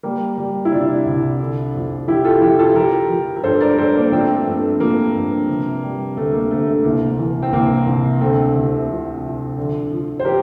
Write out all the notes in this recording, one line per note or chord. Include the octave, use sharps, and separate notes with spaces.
G3 A#3
G3
E4
C3 D4 F4
C2
D3
F2
F3 E4 G4
F4 A4
F3 E4 G4
F4 A4
F3 G4 A#4
F3
A#4
G2 A4 C5
A#4 D5
G2 A4 C5
A#3 D4
F3 A3 C4
A3
G2
A3
F3 A#3
G2
C3
G3
D2 A3
A#3
D2 A3
A3
C2 A#3
E3
C4
C2 A#3
C2
D2 A3 C4
C3
F3
F3
D3
F3
C5
G4 A#4